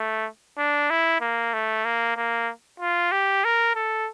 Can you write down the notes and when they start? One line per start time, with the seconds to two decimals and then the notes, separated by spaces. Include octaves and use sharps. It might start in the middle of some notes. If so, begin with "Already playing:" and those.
Already playing: A3
0.58 D4
0.90 E4
1.21 A#3
1.53 A3
1.85 A#3
2.17 A#3
2.80 F4
3.12 G4
3.45 A#4
3.75 A4